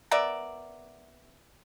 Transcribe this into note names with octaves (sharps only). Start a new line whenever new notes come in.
B3 A#4 D5 E5